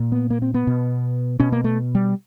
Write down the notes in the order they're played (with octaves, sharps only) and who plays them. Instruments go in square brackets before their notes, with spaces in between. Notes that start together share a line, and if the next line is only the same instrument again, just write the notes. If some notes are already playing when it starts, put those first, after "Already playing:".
Already playing: [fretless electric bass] A#2
B3
A#3
C4
B3
B2
B2 C#4
A#3
A3
G3